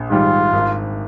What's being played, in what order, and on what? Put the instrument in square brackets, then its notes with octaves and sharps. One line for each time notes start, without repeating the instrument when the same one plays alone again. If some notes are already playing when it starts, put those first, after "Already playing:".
Already playing: [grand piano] A#1
[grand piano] G#2 D#3 G3 [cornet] F4
[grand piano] G#1